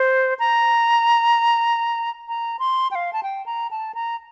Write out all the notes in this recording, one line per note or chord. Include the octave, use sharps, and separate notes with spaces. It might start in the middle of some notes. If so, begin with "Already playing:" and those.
Already playing: C5
A#5
A#5
C6
G5
F5
A5
G5
A#5
A5
A#5